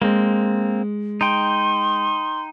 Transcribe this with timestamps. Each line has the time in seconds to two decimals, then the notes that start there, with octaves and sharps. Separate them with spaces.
0.02 G#3 A#3 C4
1.21 D#4 G5 C6